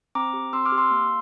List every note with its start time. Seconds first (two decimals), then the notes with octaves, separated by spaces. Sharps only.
0.15 C4 A#5 D6
0.33 G4
0.53 C4 C6 E6
0.66 D6 F6
0.72 G4
0.78 C6 E6
0.91 A#3